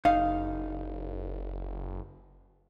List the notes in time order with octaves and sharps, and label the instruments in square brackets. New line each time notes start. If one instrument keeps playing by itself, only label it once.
[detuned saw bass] F#1 [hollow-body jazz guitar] D#4 F5